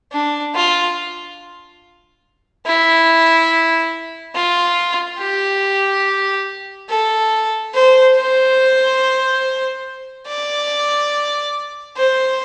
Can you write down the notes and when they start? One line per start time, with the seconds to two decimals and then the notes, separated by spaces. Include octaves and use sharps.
0.12 D4
0.55 F4
2.66 E4
4.35 F4
5.20 G4
6.89 A4
7.74 C5
8.16 C5
10.28 D5
11.97 C5